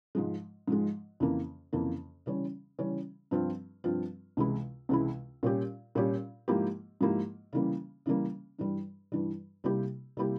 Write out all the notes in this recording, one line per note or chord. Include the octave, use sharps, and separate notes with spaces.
G#2 F3 G#3
G#2 F3 G#3
F2 C#3 E3 A#3
F2 C#3 E3 A#3
C#3 E3 G3 C#4
C#3 E3 G3 C#4
G2 F3 C4 F4
G2 F3 C4 F4
C#2 C3 E3 G#3 E4
C#2 C3 E3 G#3 E4
A#2 G3 C#4 G4
A#2 G3 C#4 G4
G#2 F3 A#3 E4 G4
G#2 F3 A#3 E4 G4
C#3 E3 G3 A#3
C#3 E3 G3 A#3
G2 E3 G3
G2 E3 G3
C3 G3 A#3 E4 G4
C3 G3 A#3 E4 G4